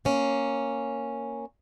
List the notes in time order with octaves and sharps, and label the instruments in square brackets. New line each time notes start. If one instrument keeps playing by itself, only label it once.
[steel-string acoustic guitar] A#3 C#4